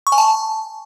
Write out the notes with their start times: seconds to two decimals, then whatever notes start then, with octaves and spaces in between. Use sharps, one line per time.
0.07 C#6
0.12 G#5
0.18 A5